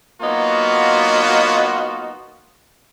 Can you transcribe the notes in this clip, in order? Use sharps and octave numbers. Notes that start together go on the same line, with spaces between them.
F#3 A#3 B3 D#4 F4 F#4